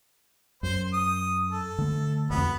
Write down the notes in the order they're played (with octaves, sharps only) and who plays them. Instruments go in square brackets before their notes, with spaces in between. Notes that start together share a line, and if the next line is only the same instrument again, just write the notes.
[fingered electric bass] F#2 [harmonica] C5
[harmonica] D#6
A4
[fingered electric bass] D3 A3
[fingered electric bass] E1 F2 [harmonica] B3